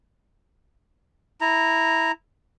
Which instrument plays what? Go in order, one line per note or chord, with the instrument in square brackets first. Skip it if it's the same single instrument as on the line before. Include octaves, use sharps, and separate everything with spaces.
[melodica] E4 A#5